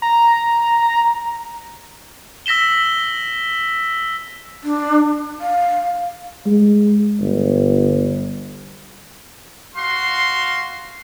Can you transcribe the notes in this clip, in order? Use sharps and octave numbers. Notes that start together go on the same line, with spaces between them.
A#5
E6 A#6 B6 E7 G7
D4
F5
G#3
G1
F#4 F5 C6